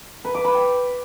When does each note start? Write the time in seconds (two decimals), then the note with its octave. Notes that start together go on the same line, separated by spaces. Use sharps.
0.25 B4
0.35 D6
0.44 B5
0.54 G5